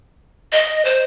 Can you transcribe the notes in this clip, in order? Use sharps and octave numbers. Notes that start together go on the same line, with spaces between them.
D#5
C5